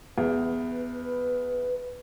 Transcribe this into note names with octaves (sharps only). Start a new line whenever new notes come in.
E2 B4